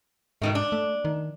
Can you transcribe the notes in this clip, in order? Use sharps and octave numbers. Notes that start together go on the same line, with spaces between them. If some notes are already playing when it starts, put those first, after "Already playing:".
G#2 B2 D#3 A3
D4
A3
D#3